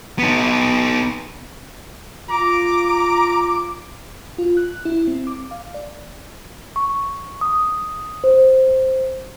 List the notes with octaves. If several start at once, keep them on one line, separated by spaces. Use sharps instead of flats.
B3 D#4
F4 A#5 D6
F4
F#6
E4
C4
D6
F5
D5
C#6
D#6
C5